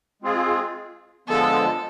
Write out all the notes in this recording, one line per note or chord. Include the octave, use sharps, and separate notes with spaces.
G#3 C4 F4 G#4
D3 F3 G#3 B3 A4